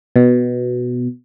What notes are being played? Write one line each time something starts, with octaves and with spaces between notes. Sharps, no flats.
B2